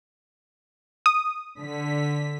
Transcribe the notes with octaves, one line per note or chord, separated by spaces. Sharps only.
D#6
D3 B6